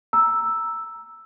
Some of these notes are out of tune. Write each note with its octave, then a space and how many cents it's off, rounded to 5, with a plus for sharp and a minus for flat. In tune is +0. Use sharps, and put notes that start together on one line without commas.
A#5 +0 E6 +0